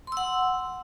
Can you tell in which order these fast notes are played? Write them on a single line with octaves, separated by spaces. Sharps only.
C6 E6 F#5